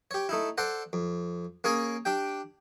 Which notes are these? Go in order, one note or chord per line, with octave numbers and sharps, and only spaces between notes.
G4 C#5
A3 D#4 E4
A4 C5 D5 F#5
F2
A#3 C#4 G#4 C#5 G#5
D4 G4 G5